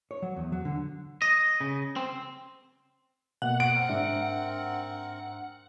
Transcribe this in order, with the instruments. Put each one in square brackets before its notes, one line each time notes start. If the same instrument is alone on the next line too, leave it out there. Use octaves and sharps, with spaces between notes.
[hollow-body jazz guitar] C#5
F#3
E2
F#3
D3
[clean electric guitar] D#5
C#3
C4
[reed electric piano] B2 A#3 [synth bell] F#5
[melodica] F#4 [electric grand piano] D7
[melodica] C4 A#4
[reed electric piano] G#2 D4 E5